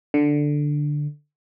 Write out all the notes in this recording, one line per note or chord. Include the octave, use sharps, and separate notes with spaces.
D3